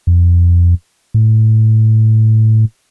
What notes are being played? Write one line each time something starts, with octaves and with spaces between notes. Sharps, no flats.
F2
A2